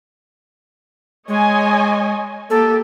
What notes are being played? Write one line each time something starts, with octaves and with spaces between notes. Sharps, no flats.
G#3 C#5 D#5 G#5
A#3 G4 A4